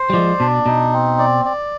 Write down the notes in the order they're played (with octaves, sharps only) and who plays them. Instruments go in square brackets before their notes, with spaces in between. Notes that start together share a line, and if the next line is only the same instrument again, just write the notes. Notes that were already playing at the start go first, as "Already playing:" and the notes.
Already playing: [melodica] C5
[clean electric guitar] G3
[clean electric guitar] F3 G#3 [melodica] D5
[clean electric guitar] B2 [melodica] D4
[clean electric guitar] B2 [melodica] D#4
[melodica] C4
D5
D5